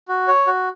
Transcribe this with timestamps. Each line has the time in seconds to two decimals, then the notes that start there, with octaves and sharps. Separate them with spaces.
0.08 F#4
0.28 C#5
0.47 F#4